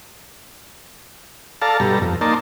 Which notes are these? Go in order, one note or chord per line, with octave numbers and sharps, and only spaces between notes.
A4 D5 F5 A5 A#5
G2 B2 G3 A4 A#5
F2
A#3 D#4 A#4 D5 A5 C6